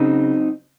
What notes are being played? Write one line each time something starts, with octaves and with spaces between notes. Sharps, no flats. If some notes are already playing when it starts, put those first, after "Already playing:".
Already playing: C#3 F#3 C4 D#4